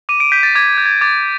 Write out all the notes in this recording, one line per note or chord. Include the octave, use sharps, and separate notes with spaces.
D6 D#7
D7
G6 B6
A6
D6 G#6
G6
G#6
D6 A6